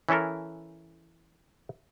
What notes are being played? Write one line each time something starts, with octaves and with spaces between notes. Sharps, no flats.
E3 C#4 E4 A4 A#4